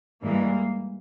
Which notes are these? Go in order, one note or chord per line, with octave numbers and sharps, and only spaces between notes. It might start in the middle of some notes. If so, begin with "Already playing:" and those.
G2 E3 G#3 A#3